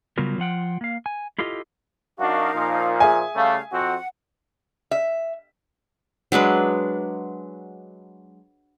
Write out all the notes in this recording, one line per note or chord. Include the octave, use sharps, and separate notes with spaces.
C#3 F#3 G3 B3 F4 A#4
F3 F4 F#5 G5
A#3 F5
G#5
E4 F4 G4 A4 D#5
F#2 D4 D#4 F#4 A#4 F5
A#2 F3
G#4 E5 G#5
C#3 G3 A3 F5
F2 C4 F#4 F#5
E5
F#3 G#3 D4 B4